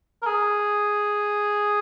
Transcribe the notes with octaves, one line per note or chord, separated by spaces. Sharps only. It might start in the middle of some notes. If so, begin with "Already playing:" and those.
A#4
G#4